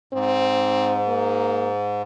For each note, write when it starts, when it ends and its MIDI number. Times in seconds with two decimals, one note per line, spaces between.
0.13 2.02 44
0.13 1.02 60
1.08 1.70 58